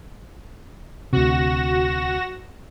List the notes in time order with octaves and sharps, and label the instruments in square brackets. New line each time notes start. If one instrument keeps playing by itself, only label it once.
[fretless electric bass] D2 C3 [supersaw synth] F#4 A#6 E7